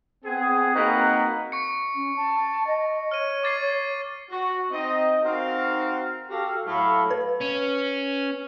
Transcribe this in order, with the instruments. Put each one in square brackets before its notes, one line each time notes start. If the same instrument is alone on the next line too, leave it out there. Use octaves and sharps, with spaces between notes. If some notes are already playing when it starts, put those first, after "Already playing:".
[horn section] B3 C4 G#4
A#3 C4 D#4 F#4 B4
[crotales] C#6 C#7
[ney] C#4
A5
D#5
[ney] C#5 [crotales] F6 D#7
[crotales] D6 A6 C7
[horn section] F#4
C4 D#4 D#5
C4 D#4 F#4 A#4 F5
F#4 G4 A4 F5
A2 F#3 A4 F5 B5
[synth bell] B4
[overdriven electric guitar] C#4